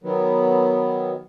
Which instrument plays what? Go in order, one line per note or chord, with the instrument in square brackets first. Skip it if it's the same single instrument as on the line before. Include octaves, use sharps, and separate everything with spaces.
[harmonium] D#3 F#3 B3